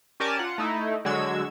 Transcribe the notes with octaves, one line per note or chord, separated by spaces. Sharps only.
C#4 G4 A#4 D5 G#5 A5
F4 F#5
A3 D#4 E4
D3 F#3 G#3 F#4 E6 G#6